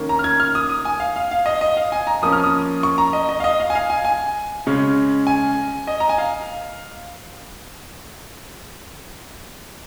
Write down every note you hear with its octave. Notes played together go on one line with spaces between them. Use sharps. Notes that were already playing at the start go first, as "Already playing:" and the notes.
Already playing: D#3 A#3 C#4
A#5
F6
G#6
F6
D#6
D#6
G#5
F5
F5
F5
D#5
D#5
F5
G#5
A#5
F3 A#3 C#4 D#6
F6
D#6
C#6
A#5
D#5
D#5
F5
D#5
F5
G#5
F5
G#5
G#5
C#3 G#3 C#4
G#5
D#5
A#5
G#5
F5